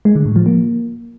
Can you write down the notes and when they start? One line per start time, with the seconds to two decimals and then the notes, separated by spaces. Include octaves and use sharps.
0.05 G#3
0.15 D3
0.26 A2
0.36 F3
0.46 A#3